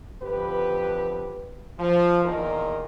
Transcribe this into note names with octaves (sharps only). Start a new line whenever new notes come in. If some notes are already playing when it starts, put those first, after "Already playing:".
F2 D3 G4 B4
F3
E2 A#2 D#3 D#4 A#4